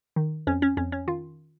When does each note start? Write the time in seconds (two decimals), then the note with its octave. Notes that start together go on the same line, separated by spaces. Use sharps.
0.16 D#3
0.47 F2 C#4
0.62 C#4
0.77 F2 C#4
0.92 C#4
1.08 D#3 F4